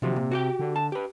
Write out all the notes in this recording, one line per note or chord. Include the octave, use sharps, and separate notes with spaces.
D#2 C3 F3 F#3
A#2
F#4 G4 G5
D3
A5
G4 B4